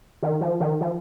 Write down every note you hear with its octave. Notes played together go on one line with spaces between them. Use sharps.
D#3
F3
D#3
F3